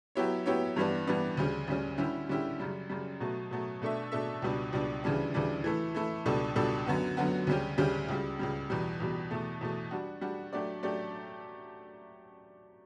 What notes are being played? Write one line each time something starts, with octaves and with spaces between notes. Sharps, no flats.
F#3 B3 E4 G4 C#5
F#3 B3 E4 G4 C#5
G2 E3 G3 B3 D4
G2 E3 G3 B3 D4
D2 C#3 G3 C#4
D2 C#3 G3 C#4
D3 G3 C#4 E4 G4
D3 G3 C#4 E4 G4
F#2 C#3 G3
F#2 C#3 G3
B2 F#3 A3
B2 F#3 A3
B2 A3 D4 A4 E5
B2 A3 D4 A4 E5
C#2 B2 G3 D4
C#2 B2 G3 D4
D2 C#3 E3 G3 D4
D2 C#3 E3 G3 D4
E3 A3 E4
E3 A3 E4
C#2 B2 G3 D4 A4
C#2 B2 G3 D4 A4
F#2 D3 F#3 B3 F#4
F#2 D3 F#3 B3 F#4
D2 C#3 G3 C#4 G4
D2 C#3 G3 C#4 G4
C#2 C#3 G3
C#2 C#3 G3
E2 B2 G3
E2 B2 G3
E2 B2 A3
E2 B2 A3
G3 D4 F#4
G3 D4 F#4
F#3 A3 D4 G4 D5
F#3 A3 D4 G4 D5